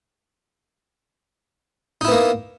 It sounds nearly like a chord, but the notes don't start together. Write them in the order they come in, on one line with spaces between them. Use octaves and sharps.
D#4 E4 B3 A#3